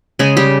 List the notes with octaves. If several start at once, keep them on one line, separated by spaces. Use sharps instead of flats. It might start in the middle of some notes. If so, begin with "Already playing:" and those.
C#3 G#3 G#4
G3 G4